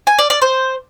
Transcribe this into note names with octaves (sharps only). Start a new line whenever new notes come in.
G#5
D5
D5
C5